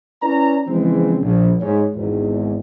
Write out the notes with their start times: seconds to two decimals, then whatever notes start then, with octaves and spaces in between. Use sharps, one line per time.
0.20 C#4 E4 B4 D5 A#5
0.67 C#3 E3 F3 G#3 C4 E4
1.21 A#1
1.60 G#2 C#5
1.94 G#1 E2 G#2